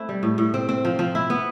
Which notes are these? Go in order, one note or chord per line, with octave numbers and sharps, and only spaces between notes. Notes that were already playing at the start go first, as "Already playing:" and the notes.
Already playing: A3 C4 E4
G3
A2
A2
C4
C4
F3
F3
E4
B3